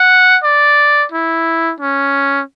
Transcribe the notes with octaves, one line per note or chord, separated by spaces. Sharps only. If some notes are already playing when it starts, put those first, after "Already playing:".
Already playing: F#5
D5
E4
C#4